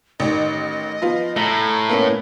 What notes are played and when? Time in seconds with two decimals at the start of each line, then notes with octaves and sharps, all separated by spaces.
0.20 A1 D#3 D#5
1.02 F3 B3 F4
1.37 A2 A#5 A#6
1.89 A#3 B3 C#4